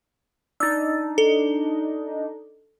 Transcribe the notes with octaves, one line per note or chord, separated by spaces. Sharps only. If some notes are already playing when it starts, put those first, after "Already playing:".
D4 D#4 E6 A6
A4